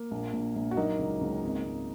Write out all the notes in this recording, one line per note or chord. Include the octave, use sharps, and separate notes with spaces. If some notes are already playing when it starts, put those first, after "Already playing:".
Already playing: A#3
A#1
A#1
A#1
F#4
F#3 A#3 D#4
C#2
C#2
G#1
G#1